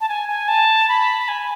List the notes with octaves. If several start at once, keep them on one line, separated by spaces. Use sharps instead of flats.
A5
G#5
G#5
A5
B5
G#5